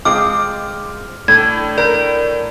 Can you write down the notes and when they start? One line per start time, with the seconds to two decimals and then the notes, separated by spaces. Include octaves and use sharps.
0.05 G#3 C4 F4 D6 F6
1.28 A2 D4 G#6
1.78 A#4 D5